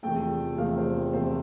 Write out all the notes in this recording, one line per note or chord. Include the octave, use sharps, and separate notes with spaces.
E2 C3 F3 A3 G5
E2 C3 F3 A3 F5
C5
E2 C3 F3 A3 C5